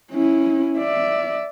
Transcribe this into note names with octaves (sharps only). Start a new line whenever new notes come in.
C#4 E4
D5 E5